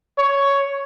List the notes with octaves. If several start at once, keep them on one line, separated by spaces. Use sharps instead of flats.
C#5